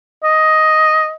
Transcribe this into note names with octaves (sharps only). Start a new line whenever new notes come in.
D#5